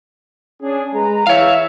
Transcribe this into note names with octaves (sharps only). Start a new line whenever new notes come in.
C#4 D4 G#4
G#3 B4 A#5
E3 C#5 E5 F5